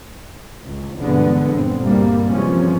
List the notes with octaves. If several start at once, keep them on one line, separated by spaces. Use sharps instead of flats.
C#2
E2 G2 B2 D3 G#3 B3
G1 G2 A#2 C4
D2 G2 G3 A#3
C3 E3 F3 G3 G#3 C#4